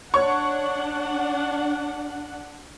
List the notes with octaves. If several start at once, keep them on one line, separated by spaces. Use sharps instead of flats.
D4 C#5 F#5 C#6